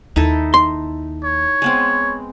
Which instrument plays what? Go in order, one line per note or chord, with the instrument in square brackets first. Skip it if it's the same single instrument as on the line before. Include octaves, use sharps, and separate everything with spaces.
[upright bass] D#2 [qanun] D#4 E4 A4
[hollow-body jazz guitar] C6
[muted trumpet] C#5
[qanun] G#3 B3 C4